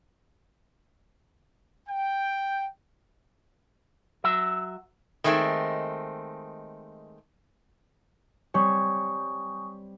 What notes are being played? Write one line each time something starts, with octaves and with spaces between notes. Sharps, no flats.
G5
F#3 E5
D#3 G#3 A3 C4
G3 C4 C#5 G#5 C#6 D#6